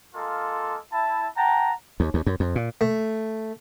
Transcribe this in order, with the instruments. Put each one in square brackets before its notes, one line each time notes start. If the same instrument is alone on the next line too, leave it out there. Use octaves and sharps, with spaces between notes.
[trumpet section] G#3 A#3 F4 A4
E4 A5
F#5 G5 A5 A#5
[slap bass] D#2
D#2
F#2
F2
A#2
[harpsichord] A3